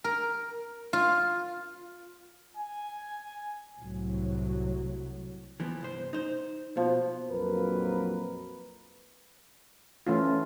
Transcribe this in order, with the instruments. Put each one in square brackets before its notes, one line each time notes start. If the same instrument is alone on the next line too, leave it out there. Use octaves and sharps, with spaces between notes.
[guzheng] A#4
F4
[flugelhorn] G#5
[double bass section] C2 A2 F#3
[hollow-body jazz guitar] E3 F3 B3
C2 G2 C5
D#4 C5
[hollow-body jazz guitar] B2 [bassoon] F3
[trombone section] A#1 F2 F#3 A#3 A#4 B4
[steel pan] E3 A3 F4 [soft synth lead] C#4